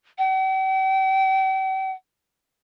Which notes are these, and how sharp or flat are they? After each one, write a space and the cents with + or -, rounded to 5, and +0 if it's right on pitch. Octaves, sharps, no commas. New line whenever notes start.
G5 -45